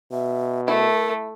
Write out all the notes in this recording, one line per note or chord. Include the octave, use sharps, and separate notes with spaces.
B2 E5
A3 E4 A#4